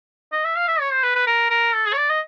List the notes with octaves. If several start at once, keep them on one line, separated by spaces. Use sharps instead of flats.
D#5
E5
F5
E5
C#5
C5
B4
B4
A#4
A#4
A4
G#4
C#5
D5
D#5